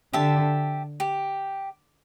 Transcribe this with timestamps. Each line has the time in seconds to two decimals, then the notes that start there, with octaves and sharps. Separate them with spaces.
0.13 D3 G4 E5 A5
1.00 G4